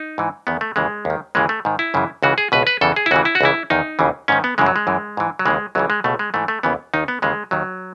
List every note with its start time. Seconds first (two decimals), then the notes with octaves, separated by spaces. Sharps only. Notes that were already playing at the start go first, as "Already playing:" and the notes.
Already playing: D#4
0.18 G#2 E3
0.47 E2 D#3 B3
0.61 A3
0.76 D#2 C#3 E3 G#3
1.05 D#2 D#3
1.35 D#2 C#3 E3 G#3
1.49 A3
1.65 G#2 D#3
1.79 E4
1.94 F#2 C#3 E3
2.23 C#2 C#3 E3 F#4
2.38 G#4
2.52 C#2 B2 B4
2.67 B4
2.81 E2 C#3 E3 A4
2.96 G#4
3.06 E4
3.11 D#2 C#3 E3 F#4
3.25 E4
3.35 F#4
3.41 C#2 C#3 E3 E4
3.70 E2 D#3 D#4
3.99 D#2 C#3 E3
4.28 G#2 D#3 C#4
4.44 B3
4.58 F#2 C#3 E3 G#3
4.66 F#3
4.76 G#3
4.87 F#2 E3
5.17 G#2 E3
5.39 F#3
5.46 D#2 C#3 E3 G#3
5.75 C#2 C#3 E3 F#3
5.90 G#3
6.04 C#2 B2 A3
6.19 G#3
6.34 G#2 E3 A3
6.48 A3
6.63 D#2 C#3 E3 B3
6.94 D#2 D#3 D#4
7.08 B3
7.22 D#2 C#3 E3 G#3
7.51 D#2 D#3 F#3